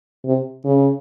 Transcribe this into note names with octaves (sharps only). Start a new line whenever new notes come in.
C3
C#3